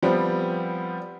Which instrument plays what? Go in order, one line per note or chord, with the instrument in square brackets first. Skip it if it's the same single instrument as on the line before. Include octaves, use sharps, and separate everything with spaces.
[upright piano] F3 G3 B3 C4